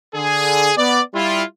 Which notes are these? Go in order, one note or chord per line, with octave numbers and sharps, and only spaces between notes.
D3 G#4
B3 D5
G3 E4 F4